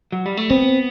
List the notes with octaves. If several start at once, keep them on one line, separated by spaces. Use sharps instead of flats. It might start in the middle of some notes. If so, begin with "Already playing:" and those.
F#3
G3
A3
B3 C4